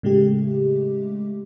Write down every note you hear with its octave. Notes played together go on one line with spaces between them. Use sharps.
A2 C#3 G#3 A3 G4